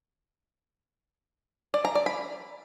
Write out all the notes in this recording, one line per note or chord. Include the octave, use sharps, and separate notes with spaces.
D5
A#5
D5
B5